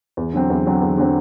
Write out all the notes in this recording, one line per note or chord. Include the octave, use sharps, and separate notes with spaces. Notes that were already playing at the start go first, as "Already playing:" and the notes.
E2
D3 F#3 C4
E2
D3 F#3 C4
E2
D3 F#3 C4